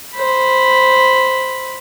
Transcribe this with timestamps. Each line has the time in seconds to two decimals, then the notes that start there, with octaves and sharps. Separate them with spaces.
0.15 C5 B5